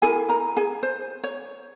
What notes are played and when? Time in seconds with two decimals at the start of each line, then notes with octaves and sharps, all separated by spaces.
0.02 E4 G#4 A#4 G#5
0.29 A#4 A#5
0.57 G#4 G#5
0.83 C5
1.24 C#5